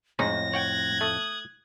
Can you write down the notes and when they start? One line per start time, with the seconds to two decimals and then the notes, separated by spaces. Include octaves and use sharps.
0.19 F2 A2 G#3 C#4 D#4 A#6
0.54 C#5 F#5 G5 F#6 G#6
1.01 A3 D#6